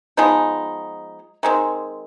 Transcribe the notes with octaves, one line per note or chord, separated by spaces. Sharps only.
F3 G#3 B3 D#4
D#3 G#3 C4